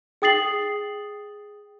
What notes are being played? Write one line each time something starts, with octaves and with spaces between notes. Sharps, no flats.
G#4 G5 D#6 A6 C7 F#7